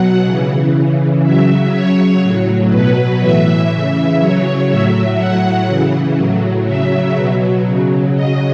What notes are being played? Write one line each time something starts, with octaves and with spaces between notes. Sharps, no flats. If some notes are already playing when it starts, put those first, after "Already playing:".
Already playing: B2 F#3 F#5
C#3 E3
C#3 E3
C#3 F#3 E5
C#3 F#3 C#5
A2 F#3
B2 F#3 B4
A2 E3 E5
C#3 E3 E5
C#3 F#3 C#5
A2 F#3 E5
A2 F#3 F#5
C#3 E3
A2 F#3
C#3 F#3 E5
B2 F#3
C#3 F#3
C#3 F#3 D#5